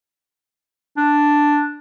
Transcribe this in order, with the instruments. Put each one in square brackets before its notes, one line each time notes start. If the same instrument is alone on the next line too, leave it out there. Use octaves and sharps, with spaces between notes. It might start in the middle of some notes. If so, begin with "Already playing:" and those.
[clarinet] D4